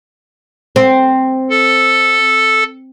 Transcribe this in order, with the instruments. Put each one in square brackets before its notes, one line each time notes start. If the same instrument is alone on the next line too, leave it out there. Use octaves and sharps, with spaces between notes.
[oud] C4
[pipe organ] A4